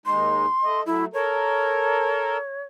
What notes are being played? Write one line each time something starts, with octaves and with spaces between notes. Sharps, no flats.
D#2 G#3 D#4 C6
A3 D#5
F#3 A3 E4
A4 A#4 C#5